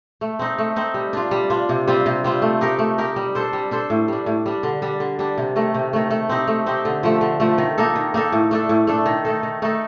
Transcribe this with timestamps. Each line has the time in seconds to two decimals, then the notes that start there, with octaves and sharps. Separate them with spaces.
0.21 A3
0.39 C4 D#4
0.58 A3
0.76 C4 D#4
0.94 G3
1.13 D4 F4
1.31 G3
1.50 D4 F4
1.69 C3
1.88 G3 C4 F4
2.06 C3
2.24 G3 C4 F4
2.42 A3
2.61 D#4 G4 A#4
2.79 A3
2.98 D#4 G4 A#4
3.16 G3
3.35 D4 A4 C5
3.53 G3
3.71 D4 A4 C5
3.90 A2
4.08 G3 D4
4.26 A2
4.46 G3 D4
4.63 D3
4.82 G3 D4
5.00 D3
5.19 G3 D4
5.38 C3
5.56 D#3 A3
5.74 C3
5.93 D#3 A3
6.10 A3
6.29 C4 D#4 G4
6.47 A3
6.66 C4 D#4 G4
6.85 D3
7.03 F3 A3
7.21 D3
7.40 F3 A3
7.58 D#3
7.78 A#3 D#4 A4
7.95 D#3
8.14 A#3 D#4 A4
8.32 A2
8.51 A3 D4 A4
8.69 A2
8.87 A3 D4 A4
9.06 D#3
9.25 A3 D#4 A4
9.43 D#3
9.62 A3 D#4 A4